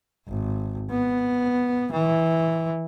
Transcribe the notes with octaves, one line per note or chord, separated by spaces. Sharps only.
G#1
B3
E3